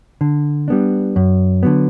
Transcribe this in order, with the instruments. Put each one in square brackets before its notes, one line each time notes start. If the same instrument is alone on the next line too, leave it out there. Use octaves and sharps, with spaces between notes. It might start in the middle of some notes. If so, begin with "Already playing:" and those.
[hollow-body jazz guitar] D3
G3 B3 D4
F#2
D3 F#3 B3